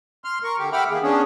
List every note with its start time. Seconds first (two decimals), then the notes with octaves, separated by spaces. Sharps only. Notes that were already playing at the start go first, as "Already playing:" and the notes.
0.24 C6 F6
0.44 A#4 C#6
0.59 D3 G4
0.72 E5 F#5 G5 B5 D6 F6
0.90 D#3 A#3 G#4
1.03 B3 C#4 D4 G#4